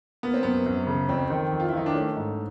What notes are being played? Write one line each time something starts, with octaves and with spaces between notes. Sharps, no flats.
A#3 B3
C4
F#2 B3
F#2
C#3
F2 C4
D#3
F2
F4
E4
D#3 D#4
D4
A3 C#4
G#2